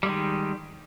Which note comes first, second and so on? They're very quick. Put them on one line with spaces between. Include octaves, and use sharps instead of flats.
G3 G#3 D#3